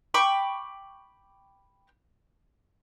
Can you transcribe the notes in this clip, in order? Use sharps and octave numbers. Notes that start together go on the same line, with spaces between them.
G5 B5 C#6 D6